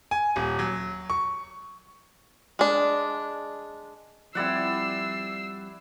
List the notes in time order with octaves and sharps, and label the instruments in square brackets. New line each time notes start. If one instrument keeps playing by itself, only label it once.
[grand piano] G#5
D#1
F#3
C#6
[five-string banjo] G#3 D4
[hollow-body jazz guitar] F3 G3 C4 [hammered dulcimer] E4 D5 F#5 [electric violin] E6 C7